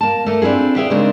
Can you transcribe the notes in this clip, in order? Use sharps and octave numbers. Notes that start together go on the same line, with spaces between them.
A#3 A5
A3 A#3
C4 D4 E4 F4 G#4
G#4 B4 E5 F5 G5
C#3 G#3 A#3 C4 D4 D#4